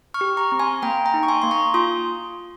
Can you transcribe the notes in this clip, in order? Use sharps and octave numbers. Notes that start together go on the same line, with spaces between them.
C#6 F6
G4
A#5 C#6
C4
G#5 C6
A#3 G5 A#5
G5 A#5
D#4
C#6
G#5 C6
A#3 C6
A#5 C#6
F4 C6 D#6